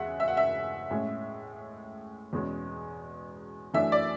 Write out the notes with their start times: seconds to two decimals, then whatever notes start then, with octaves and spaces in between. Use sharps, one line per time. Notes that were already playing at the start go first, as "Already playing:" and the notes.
Already playing: E2 C#3 G#3 E5 F#5
0.20 E5
0.28 F#5
0.37 E5
0.90 A2 G#3 C#4
2.33 E2 B2 G#3 C#4
3.74 F#2 E3 A3 D4 E5
3.92 D5